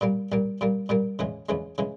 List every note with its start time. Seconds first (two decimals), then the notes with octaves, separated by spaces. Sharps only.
0.01 A#2 G3 A#3
0.32 A#2 G3 A#3
0.61 A#2 G3 A#3
0.89 A#2 G3 A#3
1.19 E2 C#3 E3 G#3
1.49 E2 C#3 E3 G#3
1.78 C#3 E3 G#3